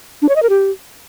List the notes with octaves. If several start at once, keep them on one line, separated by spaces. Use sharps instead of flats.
D4
C#5
D#5
A#4
G4